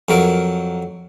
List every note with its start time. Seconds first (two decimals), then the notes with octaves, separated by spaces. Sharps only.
0.09 F2 F#3 A#4